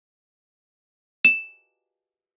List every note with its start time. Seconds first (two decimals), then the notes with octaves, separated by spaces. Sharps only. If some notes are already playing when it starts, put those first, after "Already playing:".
1.25 E7